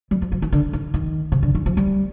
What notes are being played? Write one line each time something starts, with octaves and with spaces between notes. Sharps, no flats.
G3
F3
F3
D#3
D3
D#3
D#3
C3
D3
D#3
F3
G3